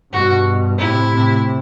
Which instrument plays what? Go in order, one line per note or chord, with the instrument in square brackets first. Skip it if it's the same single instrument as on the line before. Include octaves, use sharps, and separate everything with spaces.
[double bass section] G2 B2 [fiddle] F#4
[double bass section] A2 C3 [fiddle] E4
[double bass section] A2 C3